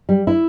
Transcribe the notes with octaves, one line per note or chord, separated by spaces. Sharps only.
G3
E4